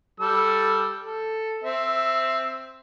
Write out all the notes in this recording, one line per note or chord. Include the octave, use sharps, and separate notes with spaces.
G3 A4 E6
A4
C4 E5